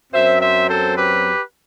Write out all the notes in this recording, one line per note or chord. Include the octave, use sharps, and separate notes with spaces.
F#2 F#3 C4 C5 E5
C5 E5
A4 C5
G4 B4